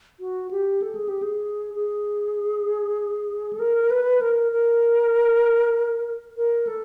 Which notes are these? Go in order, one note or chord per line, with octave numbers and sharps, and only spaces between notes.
F#4
G4
A4
G#4
G4
G#4
G#4
A4
A#4
B4
A#4
A#4
A#4
A4